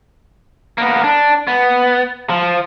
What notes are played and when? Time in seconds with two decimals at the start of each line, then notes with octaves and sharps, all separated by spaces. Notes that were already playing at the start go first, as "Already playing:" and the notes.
0.78 A#3 B3
1.04 D4
1.47 B3
2.30 F3